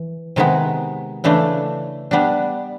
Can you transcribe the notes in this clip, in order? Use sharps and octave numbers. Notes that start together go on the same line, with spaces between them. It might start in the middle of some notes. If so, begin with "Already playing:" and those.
Already playing: E3
C3 D#3 G#3 B3
C#3 E3 A3 D4
G3 B3 D4